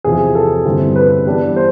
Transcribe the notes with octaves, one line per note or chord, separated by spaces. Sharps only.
E2 C3 F3 G#4
A4
G2 D3 G3 C4 E4
B4
E3 G3 B3 D4
C5